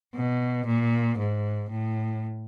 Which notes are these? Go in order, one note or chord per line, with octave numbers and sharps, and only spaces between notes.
B2
A#2
G#2
A2